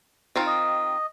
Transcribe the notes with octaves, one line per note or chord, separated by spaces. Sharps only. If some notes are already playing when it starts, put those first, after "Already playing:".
D#3 C4 F4
D#5